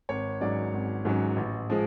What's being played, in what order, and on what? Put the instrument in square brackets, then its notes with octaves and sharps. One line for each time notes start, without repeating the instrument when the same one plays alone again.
[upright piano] G#1 C#5
G#2 F#3 C#4 D5
G#1
G#2 F#3 C#4
A1
F3 G#3